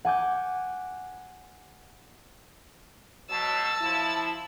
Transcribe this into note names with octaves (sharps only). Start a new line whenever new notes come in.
F#5 G#5 D6 G6
B2 F#3 A5 E6
F3 E4